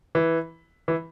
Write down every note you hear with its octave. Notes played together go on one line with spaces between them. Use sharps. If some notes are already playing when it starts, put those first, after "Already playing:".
E3
E3